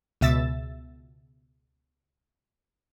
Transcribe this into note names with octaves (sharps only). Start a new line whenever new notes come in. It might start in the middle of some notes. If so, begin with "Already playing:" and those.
C#2 B2 E5 E6 A6